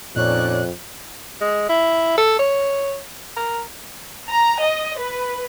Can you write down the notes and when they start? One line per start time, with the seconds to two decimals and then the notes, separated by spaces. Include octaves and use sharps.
0.16 F2 A#2 C#4 D#4 C#5 D5 F#6
1.41 G#3
1.69 E4
2.17 A4
2.39 C#5
3.37 A#4
4.28 A#5
4.63 D#5
4.99 B4